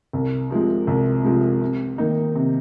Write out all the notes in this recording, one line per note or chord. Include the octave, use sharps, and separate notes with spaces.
C2
C3 F3 G#3
C2
C3 F3 G#3
C3
D#3 A#3 D#4
C3